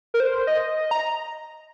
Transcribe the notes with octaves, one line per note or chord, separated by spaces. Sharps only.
A#4
C5
D#5
A#5